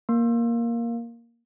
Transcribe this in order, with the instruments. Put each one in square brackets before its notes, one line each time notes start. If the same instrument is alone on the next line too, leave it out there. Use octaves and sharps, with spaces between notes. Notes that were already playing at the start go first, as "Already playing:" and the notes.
[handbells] A#3